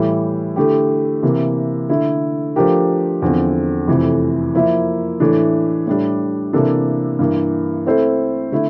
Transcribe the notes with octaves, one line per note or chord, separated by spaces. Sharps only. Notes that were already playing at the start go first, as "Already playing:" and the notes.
Already playing: A2 E3 G3
D3 A3 E4 G4
C3 E3 A#3
D3 A3 E4
F3 A3 D4 G4 A#4
E2 D3 F3 C4
F2 C3 E3 A3
F3 A#3 E4 A#4 E5
A2 E3 A3 D4
A2 G3 D4
C3 E3 A#3 D4 A4
G2 E3 A#3
A3 C4 E4 A4 C5
D3 A3 E4